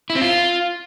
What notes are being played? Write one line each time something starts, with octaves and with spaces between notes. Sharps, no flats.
E4
C4
F4